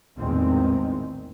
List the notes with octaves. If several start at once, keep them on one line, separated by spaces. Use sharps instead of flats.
A#1 E2 A2 D#3 G#3 C4